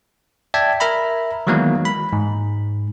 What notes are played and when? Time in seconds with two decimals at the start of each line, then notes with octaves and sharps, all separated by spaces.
0.54 D5 E5 G5 A5 G#6 B6
0.80 A#4 E5 A#5 B5
1.47 D#3 E3 F#3 G#3 A#3 B3
1.85 B5
2.13 G#2